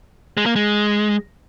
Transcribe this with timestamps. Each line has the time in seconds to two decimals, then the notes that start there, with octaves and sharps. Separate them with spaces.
0.37 G#3
0.46 A#3
0.56 G#3